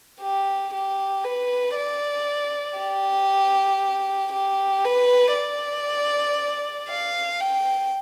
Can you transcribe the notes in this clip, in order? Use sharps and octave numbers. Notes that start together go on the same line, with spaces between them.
G4
G4
B4
D5
G4
G4
B4
D5
F5
G5